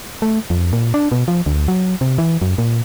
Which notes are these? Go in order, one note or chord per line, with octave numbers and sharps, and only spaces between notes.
A3
F2
A#2
D4
B2
F3
D2
F#3
C3
E3
F#2
A#2